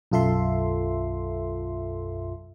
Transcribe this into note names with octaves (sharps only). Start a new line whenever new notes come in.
B1 F#2 F4 A4 E5 C6